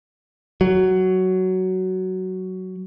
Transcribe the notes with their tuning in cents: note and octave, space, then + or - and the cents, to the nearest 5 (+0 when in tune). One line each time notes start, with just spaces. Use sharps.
F#3 +10